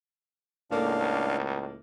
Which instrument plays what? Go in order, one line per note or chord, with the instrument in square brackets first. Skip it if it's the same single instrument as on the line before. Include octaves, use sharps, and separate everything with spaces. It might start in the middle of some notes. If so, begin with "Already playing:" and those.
[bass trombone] C#2 [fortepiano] A2 A#3 A4 [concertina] D4 F5